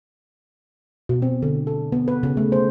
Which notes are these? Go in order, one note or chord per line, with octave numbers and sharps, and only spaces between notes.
B2
C4
D3
A4
B3
B4
C#3
A3
C5